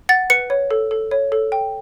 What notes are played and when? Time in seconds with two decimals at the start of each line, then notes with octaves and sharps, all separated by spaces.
0.09 F#5 A6
0.30 B4 C#7
0.50 C#5
0.71 A4
0.91 A4
1.11 C#5
1.32 A4
1.52 G5